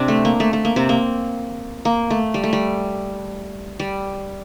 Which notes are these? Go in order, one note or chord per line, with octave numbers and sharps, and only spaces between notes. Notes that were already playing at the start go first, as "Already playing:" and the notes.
Already playing: C3 C4 D4
A3
A#3
A3
A3
A#3
C3 C4
A#3
A#3
A3
G3
A3
G3
G3